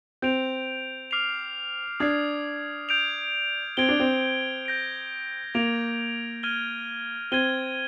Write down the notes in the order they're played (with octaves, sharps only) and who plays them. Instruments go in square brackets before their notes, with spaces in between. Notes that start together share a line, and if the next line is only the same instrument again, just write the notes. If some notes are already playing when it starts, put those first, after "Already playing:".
[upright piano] C4 [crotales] G6 D7 F7
[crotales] D6 F6 C7 F7
[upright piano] D4 [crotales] D#6 G#6 C7
[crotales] G6 D7 F7
[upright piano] C4 [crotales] G#6 D7 G7
[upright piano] D4
C4
[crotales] G6 A#6 D7
[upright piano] A#3 [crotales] G#6 D7 F7
[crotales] F6 G#6 D#7 G7
[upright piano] C4 [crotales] G#6 D#7 G7